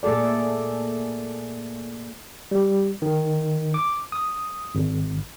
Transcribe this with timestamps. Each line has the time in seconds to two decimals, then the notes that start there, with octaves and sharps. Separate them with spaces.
0.03 A#2 A3 G#4 A4 D5
2.51 G3
3.02 D#3
3.74 D6
4.12 D#6
4.75 G#1